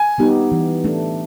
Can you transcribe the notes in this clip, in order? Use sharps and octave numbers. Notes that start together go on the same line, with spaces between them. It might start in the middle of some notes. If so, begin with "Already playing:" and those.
Already playing: G#5
G3 B3 D#4 G4
E3
A3 D4